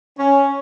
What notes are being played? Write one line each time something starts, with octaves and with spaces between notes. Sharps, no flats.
C#4